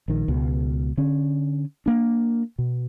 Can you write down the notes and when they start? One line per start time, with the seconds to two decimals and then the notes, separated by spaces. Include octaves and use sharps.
0.08 A#1 D#3
0.28 C#2 B2
0.97 D3 C#4
1.86 A#3 D4
2.59 B2